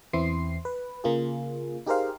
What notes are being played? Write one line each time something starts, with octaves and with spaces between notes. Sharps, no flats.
E2 E3 C4 E4 C6 C7
B4
C#3 A#3 F4 G#4
D#4 G4 G#4 A#4 C5 F5